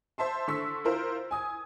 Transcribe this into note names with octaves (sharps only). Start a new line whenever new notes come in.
C5 E5 A5 C6
D3 C6 C#6 E6 B6
E4 F4 A#4 C5
G#5 D#6 G#6